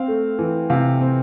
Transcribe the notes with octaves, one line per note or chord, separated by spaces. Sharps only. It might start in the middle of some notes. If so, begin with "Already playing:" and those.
Already playing: C4 F5
A3
E3
C3 F5
C4